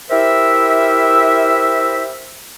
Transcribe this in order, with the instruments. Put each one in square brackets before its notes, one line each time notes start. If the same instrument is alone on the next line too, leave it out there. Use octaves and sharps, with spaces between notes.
[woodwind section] E4 G4 A#4 C5 E5